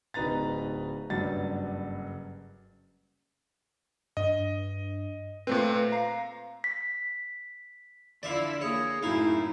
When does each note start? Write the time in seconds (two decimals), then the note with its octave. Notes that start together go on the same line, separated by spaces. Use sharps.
0.14 D1 D#4 B4 A#5 A6
1.10 F#1 G2 F#3 A6
4.17 G2 D#5
5.47 A#2 A3 C4 B4
5.92 F5 A#5
6.64 B6
8.23 D3 F3 E4 D5 E5 F5
8.61 A#3 G#4 C#5
9.03 F#2 A2 D#4 E4 F5